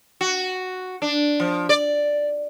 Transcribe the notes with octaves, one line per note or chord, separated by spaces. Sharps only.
F#4
D4
F3
D5